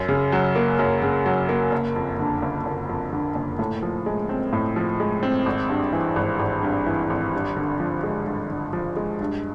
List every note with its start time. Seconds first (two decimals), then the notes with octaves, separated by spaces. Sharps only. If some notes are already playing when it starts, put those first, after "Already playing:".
Already playing: F#2
0.08 C#3
0.32 F#3
0.56 A#3
0.79 F#2
1.02 C#3
1.26 F#3
1.49 A#3
1.72 F#1
1.96 F2
2.19 D3
2.42 F#1
2.66 F#1
2.89 F2
3.13 D3
3.35 F#1
3.59 A2
3.83 F3
4.06 G#3
4.29 C4
4.53 A2
4.76 F3
5.00 G#3
5.23 C4
5.46 G#1
5.69 G2
5.93 E3
6.16 G#1
6.40 G#1
6.63 G2
6.86 E3
7.10 G#1
7.33 G2
7.56 D3
7.80 F3
8.03 G#3
8.27 G2
8.50 D3
8.73 F3
8.96 G#3
9.20 G2